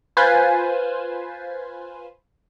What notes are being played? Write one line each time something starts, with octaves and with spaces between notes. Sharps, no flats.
F4 B4 C5 G#5